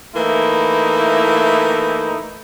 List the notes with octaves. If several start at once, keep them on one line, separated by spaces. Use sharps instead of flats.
E3 A3 A#3 D#4 E4